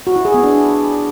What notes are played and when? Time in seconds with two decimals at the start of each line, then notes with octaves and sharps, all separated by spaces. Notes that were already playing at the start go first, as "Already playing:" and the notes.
0.07 F#4
0.16 E4
0.25 G#4
0.34 B3
0.43 D4